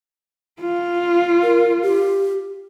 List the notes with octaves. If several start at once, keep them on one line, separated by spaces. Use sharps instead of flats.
F4
A#4
G4